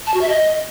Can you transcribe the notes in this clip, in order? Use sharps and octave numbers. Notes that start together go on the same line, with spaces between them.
A5
F#4
E5
D#5